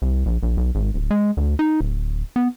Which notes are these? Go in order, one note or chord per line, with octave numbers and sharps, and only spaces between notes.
C2
A#1
A#1
B1
G#1
D1
G#3
D2
D#4
D1
B3